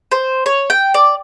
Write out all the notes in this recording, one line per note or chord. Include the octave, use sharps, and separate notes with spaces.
C5
C#5
G5
D5